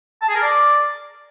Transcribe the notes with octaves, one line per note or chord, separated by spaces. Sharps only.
A5
G#4
A#4
D5